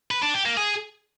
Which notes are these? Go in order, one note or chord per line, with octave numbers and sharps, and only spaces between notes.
B4
D4
G4
A#3
G#4